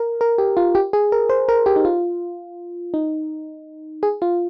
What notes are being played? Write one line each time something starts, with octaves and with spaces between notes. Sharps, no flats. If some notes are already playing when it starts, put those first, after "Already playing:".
Already playing: A#4
A#4
G4
F4
G4
G#4
A#4
C5
A#4
G4
D#4
F4
D#4
G#4
F4